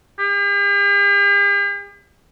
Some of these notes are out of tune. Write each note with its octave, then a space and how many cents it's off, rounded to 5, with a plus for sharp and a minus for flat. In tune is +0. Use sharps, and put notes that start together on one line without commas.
G4 +45